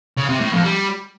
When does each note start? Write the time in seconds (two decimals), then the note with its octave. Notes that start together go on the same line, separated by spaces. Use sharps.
0.17 C#3
0.29 C3
0.40 A2
0.52 F2
0.64 G3